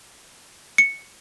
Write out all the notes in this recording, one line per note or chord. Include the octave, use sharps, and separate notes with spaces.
C#7